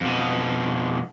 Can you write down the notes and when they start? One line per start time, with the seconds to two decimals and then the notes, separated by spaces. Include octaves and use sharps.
0.01 F2 B2